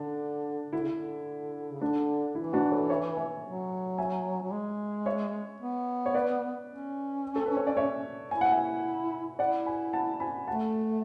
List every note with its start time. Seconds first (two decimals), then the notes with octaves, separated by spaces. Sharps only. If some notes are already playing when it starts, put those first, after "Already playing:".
Already playing: D3 D4
0.73 D3 E4
0.82 C#3
0.91 D3
1.71 C#3
1.81 D3 D4
2.35 E3 E4
2.53 D4 F#4
2.71 A4 C#5
2.90 C#5 E5
3.17 E5 G#5
3.44 F#3
3.98 E5 G#5
4.42 F#3
4.52 G#3
5.06 C#5 E5
5.60 B3
6.06 C#5
6.14 B4 D5
6.68 C#4
7.36 A4
7.46 B4
7.57 C#5
7.67 D5
7.77 C#5 E5
8.31 E4 G#5
8.41 F#5
8.51 E5 G#5
9.39 E4 D5 F#5
9.66 G#5 B5
9.93 F#5 A5
10.20 G#5 B5
10.48 A3 F#5 A5